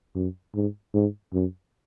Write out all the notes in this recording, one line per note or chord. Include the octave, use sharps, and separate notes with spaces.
F#2
G#2
G#2
F#2